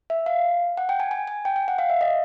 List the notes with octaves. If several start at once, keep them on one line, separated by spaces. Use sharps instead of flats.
E5
F5
F#5
G5
G#5
G#5
G#5
G5
G5
F#5
F5
E5
D#5